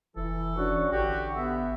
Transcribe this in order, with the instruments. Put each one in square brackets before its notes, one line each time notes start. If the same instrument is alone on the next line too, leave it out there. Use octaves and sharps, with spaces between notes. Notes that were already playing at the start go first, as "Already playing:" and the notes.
[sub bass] F1 [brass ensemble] E3 [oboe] A4
[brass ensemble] E3 C#4 D4 [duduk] F#4
[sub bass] A1 [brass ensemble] D3 [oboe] F#4 [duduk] G4
[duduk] B3 [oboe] E5